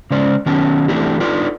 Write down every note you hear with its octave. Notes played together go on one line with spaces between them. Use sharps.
C#3 G#3 C#4 C5 D5
D#3 F#3 B3 C#4 A5
E3 A3 C4 D4 E4 G4
D4 D#4 F4 A4 B4 D5